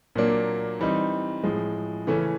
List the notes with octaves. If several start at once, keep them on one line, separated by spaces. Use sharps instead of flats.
A#2 F#3 A#3 D4
E3 G3 C4 D#4
A2 F3 G#3
C#3 E3 A3 C#4